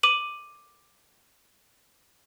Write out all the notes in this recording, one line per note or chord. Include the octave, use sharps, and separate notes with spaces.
D6 D#7 F#7